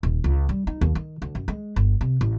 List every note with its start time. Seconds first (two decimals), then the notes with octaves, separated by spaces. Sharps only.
0.03 D#1
0.24 C#2
0.49 G3
0.67 D#4
0.81 D#2
0.95 D#3
1.22 D2
1.35 F#2
1.48 G#3
1.76 G1
2.01 C3
2.21 A1